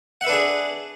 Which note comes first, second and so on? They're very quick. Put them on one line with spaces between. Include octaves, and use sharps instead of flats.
F#5 E5 B4 D4 G#4